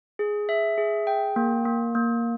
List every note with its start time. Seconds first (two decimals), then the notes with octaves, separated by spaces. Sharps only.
0.19 G#4
0.49 E5
0.78 G#4
1.07 G5
1.36 A#3
1.65 A#3
1.95 A#3